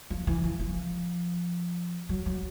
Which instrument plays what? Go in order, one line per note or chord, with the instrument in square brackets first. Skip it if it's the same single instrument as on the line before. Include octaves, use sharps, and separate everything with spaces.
[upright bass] F3
E3
F3
F3
F#3
F#3